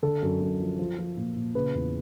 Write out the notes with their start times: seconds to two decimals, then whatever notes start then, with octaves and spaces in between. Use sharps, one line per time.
0.03 D3 A4
0.23 F#2
0.42 F#2
0.60 F3
0.79 F3
0.98 F3
1.17 A#2
1.36 A#2
1.55 C#3 B4
1.74 E2